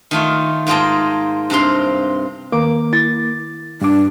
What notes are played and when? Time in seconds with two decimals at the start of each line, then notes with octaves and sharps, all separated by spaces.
0.11 D#3 A3 F4
0.67 G#2 A#3 F4 G#4 G5 A5
1.50 G2 C3 C5 F5 C6
2.52 D#3 A#3 D6
2.93 E4 A6
3.81 G2 D4 D6